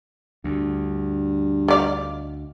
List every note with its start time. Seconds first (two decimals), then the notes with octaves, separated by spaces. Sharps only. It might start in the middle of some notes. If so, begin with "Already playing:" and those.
0.44 D2 G2
1.68 D#3 D5 F5